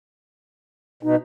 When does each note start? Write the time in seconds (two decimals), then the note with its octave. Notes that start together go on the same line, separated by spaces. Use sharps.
1.03 B2 D#4